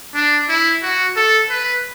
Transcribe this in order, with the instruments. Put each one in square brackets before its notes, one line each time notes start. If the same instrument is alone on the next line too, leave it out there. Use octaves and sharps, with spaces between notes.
[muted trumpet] D4
E4
F#4
A4
B4